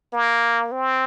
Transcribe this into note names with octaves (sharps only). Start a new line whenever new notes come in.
A#3
C4